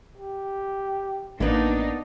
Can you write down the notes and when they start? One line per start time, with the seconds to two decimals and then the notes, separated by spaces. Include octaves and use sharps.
0.17 G4
1.40 A1 A#3 B3 D4 D#4 B4